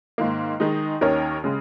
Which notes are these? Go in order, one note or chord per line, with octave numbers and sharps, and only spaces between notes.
G#2 D#3 A#3
D#3 G#3 D#4
D#2 D#3 C#4 A#4 C#5
C#3 G#3